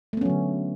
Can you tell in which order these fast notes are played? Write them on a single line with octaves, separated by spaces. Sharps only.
A3 B3 C#4 F#3 D3